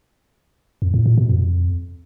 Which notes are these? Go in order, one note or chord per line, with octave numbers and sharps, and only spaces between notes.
F2
A2
A#2
B2
F2